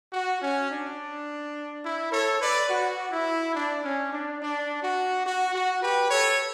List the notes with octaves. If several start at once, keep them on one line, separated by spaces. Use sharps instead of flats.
F#4
C#4
D4
E4
A4 C#5
B4 D5
F#4
E4
D4
C#4
D4
D4
F#4
F#4
F#4
G4 B4
A4 C#5